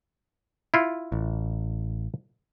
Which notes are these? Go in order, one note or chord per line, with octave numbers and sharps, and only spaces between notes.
E4 F4
A1